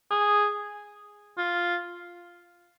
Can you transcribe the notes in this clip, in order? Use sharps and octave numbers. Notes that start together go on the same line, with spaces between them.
G#4
F4